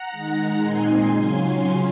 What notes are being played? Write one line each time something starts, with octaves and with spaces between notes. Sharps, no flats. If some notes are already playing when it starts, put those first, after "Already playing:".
Already playing: F#5 A#5
D#3 G#3 D#4
A#2 G#3 C4 D#4 G#5 C6
C#3 F#3 C#4 F4 G#5 C6